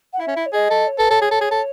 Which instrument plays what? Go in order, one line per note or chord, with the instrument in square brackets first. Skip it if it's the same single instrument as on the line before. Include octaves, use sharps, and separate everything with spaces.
[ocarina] F#5
[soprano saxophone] E4 [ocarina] E5
[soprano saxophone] C#4
E4
[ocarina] C#5
[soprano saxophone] G#4 [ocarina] D#5
[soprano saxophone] A4
[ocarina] C#5
[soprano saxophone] A4 [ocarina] B4
[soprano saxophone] A4 [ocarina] C#5
[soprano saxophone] G#4
A4
G#4
A4